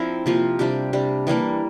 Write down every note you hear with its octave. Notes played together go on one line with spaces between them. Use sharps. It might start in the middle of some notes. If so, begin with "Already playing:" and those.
Already playing: F3 C4 D4 E4 A#4
C3 F3 A#3 F4
C3 G3 D4 G4
C3 G3 D4
E3 G3 A#3 D4